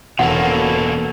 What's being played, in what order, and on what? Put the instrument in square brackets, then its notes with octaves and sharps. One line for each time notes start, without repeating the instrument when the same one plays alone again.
[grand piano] E1 [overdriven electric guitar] B2 A#3 [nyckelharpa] C#4 A4 [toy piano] F#5